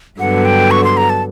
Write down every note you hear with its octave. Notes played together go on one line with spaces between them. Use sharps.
G2 D3 F#3 B3 F#5
G5
C#6
C6
A#5
A5